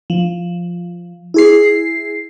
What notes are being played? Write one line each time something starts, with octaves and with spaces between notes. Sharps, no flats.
F3
E4 G#4 C7